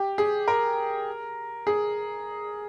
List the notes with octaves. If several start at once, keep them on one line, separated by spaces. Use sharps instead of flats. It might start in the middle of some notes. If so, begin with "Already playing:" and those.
Already playing: G4
G#4
A#4
G#4